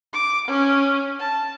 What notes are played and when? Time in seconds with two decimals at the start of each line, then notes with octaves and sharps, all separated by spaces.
0.13 D6
0.48 C#4
1.20 A5